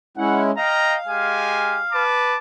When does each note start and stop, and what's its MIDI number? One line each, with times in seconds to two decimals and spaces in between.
0.17 0.51 56
0.17 0.51 61
0.17 0.51 64
0.17 0.42 78
0.57 0.98 75
0.57 2.03 77
0.57 0.98 79
0.57 0.98 82
1.08 1.81 56
1.08 1.81 67
1.08 1.81 80
1.92 2.37 71
1.92 2.37 81
1.92 2.37 86